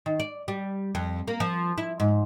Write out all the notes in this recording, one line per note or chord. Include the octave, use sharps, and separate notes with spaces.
D#3
D5
G3
F2
A#3
F3
E4
G#2